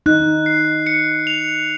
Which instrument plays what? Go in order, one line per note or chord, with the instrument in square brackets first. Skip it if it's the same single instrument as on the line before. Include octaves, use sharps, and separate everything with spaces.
[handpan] D#4 [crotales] F#6
[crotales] C7
C#7
F7